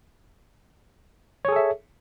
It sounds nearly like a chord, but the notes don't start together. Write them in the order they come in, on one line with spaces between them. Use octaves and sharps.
C#5 G#4 A4 E5